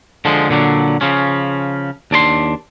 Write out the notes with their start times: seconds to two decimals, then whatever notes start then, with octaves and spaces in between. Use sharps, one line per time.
0.25 D3 F3 G#3
0.49 A#2 D3 F#3 D4
1.01 C#3 F3 C#4
2.11 D#2 D4 D5 C6